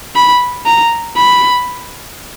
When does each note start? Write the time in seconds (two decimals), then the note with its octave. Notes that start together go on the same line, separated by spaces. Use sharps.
0.16 B5
0.66 A#5
1.17 B5